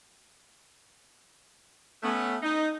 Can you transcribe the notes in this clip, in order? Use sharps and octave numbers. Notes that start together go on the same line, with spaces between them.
A3 B3 C#4
D#4